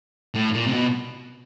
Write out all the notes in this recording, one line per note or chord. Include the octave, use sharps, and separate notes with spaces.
A2
A#2
C3
B2